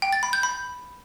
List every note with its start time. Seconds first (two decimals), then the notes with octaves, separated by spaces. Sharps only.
0.02 G5
0.13 A6
0.23 B5
0.33 G6
0.43 B5